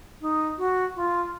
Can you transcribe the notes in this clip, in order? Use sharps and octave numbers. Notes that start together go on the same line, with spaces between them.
D#4
F#4
F4